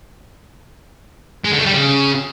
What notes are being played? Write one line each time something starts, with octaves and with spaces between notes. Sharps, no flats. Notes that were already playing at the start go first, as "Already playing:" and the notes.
G#3
D3
A3
G3
C#3